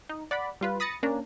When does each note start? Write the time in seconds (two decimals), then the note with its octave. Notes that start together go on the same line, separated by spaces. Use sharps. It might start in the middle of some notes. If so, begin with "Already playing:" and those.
0.09 D#4
0.31 D5 F#5 B5
0.61 G3 F4 B4
0.80 B5 D#6 A6 A#6 C#7
1.03 A#3 C#4 D4 A#5